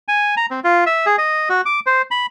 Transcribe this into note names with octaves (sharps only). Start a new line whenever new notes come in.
G#5
A#5
C4
F4
E5
G#4
D#5
F#4
D6
C5
B5